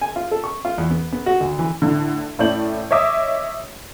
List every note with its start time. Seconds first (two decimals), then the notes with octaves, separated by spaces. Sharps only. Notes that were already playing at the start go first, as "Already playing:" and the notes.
0.01 G#5
0.16 F4
0.31 A4
0.44 C#6
0.65 F4
0.78 E2
0.91 B3
1.12 B3
1.26 F#4
1.40 D2
1.59 E3
1.82 A2 D3
2.39 A2 A3 C#4 D5 G6 F#7
2.91 C#5 D#5 E5 D6 D#6